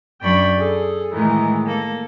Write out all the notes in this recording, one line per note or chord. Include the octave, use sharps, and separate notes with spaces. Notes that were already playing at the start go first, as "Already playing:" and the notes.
F#2 D4 G5 B5 C#6
G#4 A4
A2 D#3 E3 G#3
A#3 A4